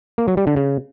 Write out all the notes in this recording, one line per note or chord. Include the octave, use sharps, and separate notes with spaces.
A#3
F#3
G3
D3
C#3